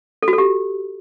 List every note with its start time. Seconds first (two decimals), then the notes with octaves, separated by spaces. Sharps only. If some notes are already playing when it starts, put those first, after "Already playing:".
0.23 A4
0.28 F#4
0.33 A4
0.38 G4